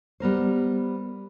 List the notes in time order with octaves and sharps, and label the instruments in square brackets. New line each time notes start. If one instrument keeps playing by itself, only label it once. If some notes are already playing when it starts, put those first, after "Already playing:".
[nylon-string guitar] G3 B3 A#4 C5